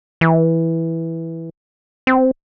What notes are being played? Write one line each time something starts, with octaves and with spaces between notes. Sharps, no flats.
E3
C4